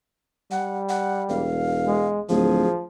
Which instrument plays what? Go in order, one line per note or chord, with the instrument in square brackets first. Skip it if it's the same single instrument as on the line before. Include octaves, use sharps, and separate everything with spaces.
[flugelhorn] G3 [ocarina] F#5
[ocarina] F#5
[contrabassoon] E1 [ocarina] F5
[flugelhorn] G#3
[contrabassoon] D1 [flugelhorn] F3 [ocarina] G#4